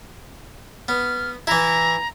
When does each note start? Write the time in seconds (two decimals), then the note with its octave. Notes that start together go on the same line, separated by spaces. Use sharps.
0.88 B3 F6
1.47 E3 E4 A#5